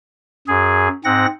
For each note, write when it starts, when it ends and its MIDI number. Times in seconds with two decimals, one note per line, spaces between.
0.48 0.88 42
0.48 0.88 68
1.04 1.26 44
1.04 1.26 60
1.04 1.26 78
1.04 1.26 94